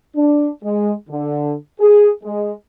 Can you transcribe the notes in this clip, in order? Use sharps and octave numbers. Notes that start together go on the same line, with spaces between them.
D4
G#3
D3
G#4
G#3